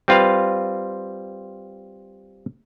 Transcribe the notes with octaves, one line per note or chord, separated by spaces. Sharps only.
G3 C4 F4 B4 F5